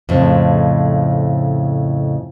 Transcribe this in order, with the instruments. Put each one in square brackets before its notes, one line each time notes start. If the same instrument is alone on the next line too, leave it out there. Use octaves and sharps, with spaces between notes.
[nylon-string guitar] F2 A2 C#3